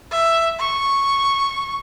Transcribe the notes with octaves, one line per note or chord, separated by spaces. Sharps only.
E5
C#6